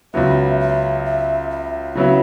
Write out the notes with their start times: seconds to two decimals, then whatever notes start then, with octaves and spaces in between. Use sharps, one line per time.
0.14 C#2 C#3 F#3 B3 E5
0.60 E5
1.05 E5
1.51 E5
1.95 C#3 F#3 B3 E4